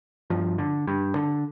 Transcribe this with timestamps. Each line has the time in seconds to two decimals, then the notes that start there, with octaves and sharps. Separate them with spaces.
0.30 G2 F3
0.58 D3
0.87 G2
1.15 D3